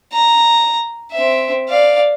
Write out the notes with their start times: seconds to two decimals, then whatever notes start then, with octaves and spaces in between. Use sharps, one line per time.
0.13 A#5
1.12 C4 E5
1.69 D5 F5